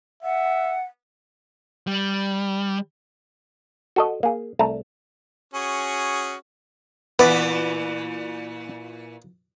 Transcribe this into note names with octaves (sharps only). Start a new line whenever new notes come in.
E5 F#5
G3
F#4 A4 D#5
A#3 G#4
C2 A3 A5 A#5
C#4 F#4 G#4
A#2 E3 B3 E4 B4 D5